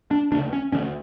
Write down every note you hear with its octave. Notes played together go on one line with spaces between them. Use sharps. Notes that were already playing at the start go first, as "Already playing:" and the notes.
D4
D2 C#3 D4
C#4
D2 D3 C#4